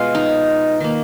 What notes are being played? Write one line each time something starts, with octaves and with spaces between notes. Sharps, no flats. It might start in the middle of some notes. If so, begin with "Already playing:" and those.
Already playing: B2 G#3 B3 F4
D#4
D#3 A#3